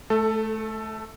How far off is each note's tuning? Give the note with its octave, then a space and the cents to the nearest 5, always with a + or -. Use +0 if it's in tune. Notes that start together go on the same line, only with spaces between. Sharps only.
A3 -20 A4 +10